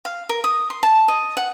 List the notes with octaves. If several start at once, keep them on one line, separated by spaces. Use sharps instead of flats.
F5
A#4
D#6
C6
A5
D#5
F#5